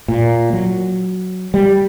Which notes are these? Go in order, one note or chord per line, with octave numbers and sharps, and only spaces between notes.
A#2
F#3
G3